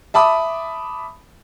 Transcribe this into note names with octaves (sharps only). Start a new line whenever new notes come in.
E5 A5 B5 D6 D#6